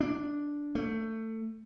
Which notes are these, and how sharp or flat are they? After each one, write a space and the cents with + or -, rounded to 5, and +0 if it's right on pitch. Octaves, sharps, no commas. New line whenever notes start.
D4 -5
A3 +20